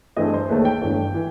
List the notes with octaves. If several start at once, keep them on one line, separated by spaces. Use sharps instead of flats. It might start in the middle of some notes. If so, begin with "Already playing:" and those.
G2 E3 A3 C4 D#5
C5
E1 D#2 D#3 A3 B4
G5
G1 G2 E3 A3
E3